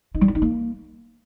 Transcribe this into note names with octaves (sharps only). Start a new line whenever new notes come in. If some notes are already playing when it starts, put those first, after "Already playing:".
D#4
G3
E4
D#4
A#3